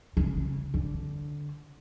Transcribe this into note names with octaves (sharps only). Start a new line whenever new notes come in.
C#3
D3